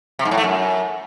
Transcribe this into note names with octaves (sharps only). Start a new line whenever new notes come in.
C3
G#2
A2
A3
F#2